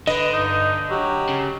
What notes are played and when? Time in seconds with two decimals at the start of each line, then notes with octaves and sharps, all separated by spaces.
0.07 D3 B4 D#5
0.33 G2 D#4
0.90 F#3 G4
1.29 C#3